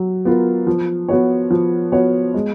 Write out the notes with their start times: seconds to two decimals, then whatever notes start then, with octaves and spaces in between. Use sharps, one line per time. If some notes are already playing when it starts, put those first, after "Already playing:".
Already playing: F#3
0.25 B3 F4 A#4
0.67 F3
1.09 B3 F#4 C#5
1.50 F3
1.92 B3 F#4 C#5
2.34 G#3